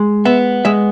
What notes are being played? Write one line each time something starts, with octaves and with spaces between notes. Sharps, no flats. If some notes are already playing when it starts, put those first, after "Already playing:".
Already playing: G#3
B3 E5
G#3 E5